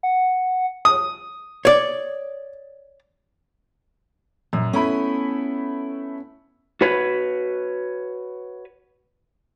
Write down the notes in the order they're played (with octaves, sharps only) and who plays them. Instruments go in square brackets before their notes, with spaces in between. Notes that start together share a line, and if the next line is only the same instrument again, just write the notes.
[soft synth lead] F#5
[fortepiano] D#6
[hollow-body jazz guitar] C#5 D5
[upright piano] F#2 [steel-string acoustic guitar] A#2
[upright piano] A3 E4 B5 [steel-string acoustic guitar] B3 C#4
[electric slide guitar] F#4 B4 C#5